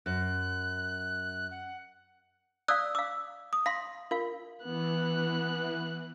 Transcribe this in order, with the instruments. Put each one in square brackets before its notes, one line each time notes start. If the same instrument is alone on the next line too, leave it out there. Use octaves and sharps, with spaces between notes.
[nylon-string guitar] F#2 [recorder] F#6
[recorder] F#5
[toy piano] D5 F5 [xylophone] D#6 E6 F#6
[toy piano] F5 E6 [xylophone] D6
[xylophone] D#6
[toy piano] F5 C6 [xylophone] A#6
[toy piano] F4 F5 [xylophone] A#4
[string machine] E3 [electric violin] B3 F#6